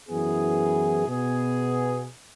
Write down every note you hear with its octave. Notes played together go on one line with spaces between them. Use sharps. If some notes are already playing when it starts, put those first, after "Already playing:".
F#2 E3 B3 E4 G#4
B2 B3 G#4